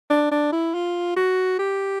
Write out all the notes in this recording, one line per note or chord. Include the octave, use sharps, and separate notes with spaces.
D4
D4
E4
F4
F#4
G4